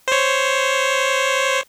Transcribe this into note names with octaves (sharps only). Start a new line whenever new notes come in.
C5 C#5